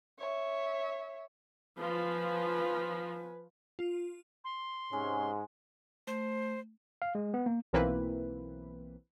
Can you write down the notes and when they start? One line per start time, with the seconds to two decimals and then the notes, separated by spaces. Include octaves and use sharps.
0.19 C#5 E5
1.79 F3 B4 G#5
3.79 F4
4.44 C6
4.93 G#2 C3 G#3 C#4
6.07 A3 C5
7.02 F5
7.15 G#3
7.34 B3
7.46 A#3
7.73 B1 E3 A#3 C4 E4 B4